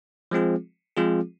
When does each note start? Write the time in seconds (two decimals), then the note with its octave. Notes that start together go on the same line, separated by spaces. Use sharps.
0.31 F3 G#3 C4 F4 G#4
0.97 F3 G#3 C4 F4 G#4